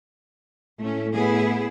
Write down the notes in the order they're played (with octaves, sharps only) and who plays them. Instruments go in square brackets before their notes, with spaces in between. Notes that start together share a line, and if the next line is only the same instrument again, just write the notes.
[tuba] A2 [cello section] A3 C#4
[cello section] B3 E4 G#4